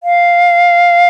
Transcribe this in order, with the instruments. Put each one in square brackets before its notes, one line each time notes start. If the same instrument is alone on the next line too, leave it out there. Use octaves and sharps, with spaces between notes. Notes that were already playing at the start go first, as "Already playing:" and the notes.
[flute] F5